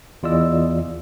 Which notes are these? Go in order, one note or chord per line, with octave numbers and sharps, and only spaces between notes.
E2 F4 D5 D#5 E6